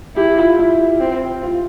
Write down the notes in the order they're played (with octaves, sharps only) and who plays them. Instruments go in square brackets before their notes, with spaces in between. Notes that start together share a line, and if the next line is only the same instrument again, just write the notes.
[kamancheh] E4 [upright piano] G4
[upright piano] F4
E4
[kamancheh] C4
[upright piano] F4